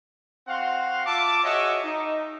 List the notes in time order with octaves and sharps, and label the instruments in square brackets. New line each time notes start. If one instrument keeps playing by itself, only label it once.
[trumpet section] C4 F#4 F5 F#5 C6
F4 E5 A5 D6
F#4 G#4 C#5 D#5 E5
D#4